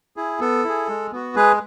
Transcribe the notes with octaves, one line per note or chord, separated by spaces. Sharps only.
E4 G#4
B3 A4
E4 G#4
G#3
B3 F#4
G#3 G#4 B4